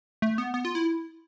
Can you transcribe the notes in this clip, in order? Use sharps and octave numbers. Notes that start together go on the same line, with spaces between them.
A3
B3
B3
F4
E4